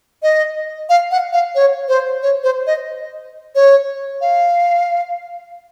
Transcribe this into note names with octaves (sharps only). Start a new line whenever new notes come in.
D#5
F5
F#5
F5
C#5
C5
C#5
C5
D#5
C#5
F5